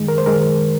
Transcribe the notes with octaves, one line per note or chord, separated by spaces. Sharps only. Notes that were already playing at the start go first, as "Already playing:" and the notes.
Already playing: F#2 D#3 G#3
A#4
C5
F#2 D#3 G#3 A#4